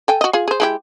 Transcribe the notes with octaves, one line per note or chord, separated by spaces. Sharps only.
A4 G5 G#5
F#4 D#5
F4 G#4
G#4 C5
G#3 E4 G4